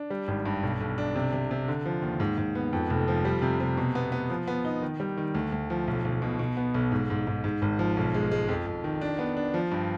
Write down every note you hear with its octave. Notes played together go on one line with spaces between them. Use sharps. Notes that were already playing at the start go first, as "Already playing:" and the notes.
Already playing: D4
G3
G#1
G2
B1
B1
D4
C3
C3
C3
D3
F3
D#2
G#2
G#2
B3
F2
F1
F3
G3
C3
C3
B2
B3
B3
F3
B3
D#4
D#3
G3
D#3
D2
D2
F3
B1
B1
B2
B2
B3
B1
G#2
G#2
G#2
G#2
G#1
F3
B1
G#3
G#3
F2
F2
D#3
D4
B3
D4
F3
G2